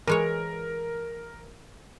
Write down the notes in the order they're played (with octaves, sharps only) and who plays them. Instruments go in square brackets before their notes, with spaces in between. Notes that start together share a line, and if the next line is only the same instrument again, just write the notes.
[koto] E3 G#3 C#5 [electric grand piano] A#4